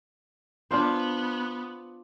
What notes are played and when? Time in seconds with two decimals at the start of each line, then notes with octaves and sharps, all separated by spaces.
0.71 B3 D4 F4 C5